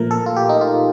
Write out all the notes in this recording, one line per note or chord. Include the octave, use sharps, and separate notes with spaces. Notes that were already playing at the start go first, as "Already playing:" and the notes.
Already playing: A#2 F3 A3 A#4
A4
F4
G4
D#4
F4